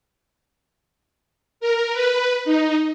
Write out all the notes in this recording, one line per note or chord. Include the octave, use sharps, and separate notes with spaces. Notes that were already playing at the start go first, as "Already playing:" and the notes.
A#4
B4
D#4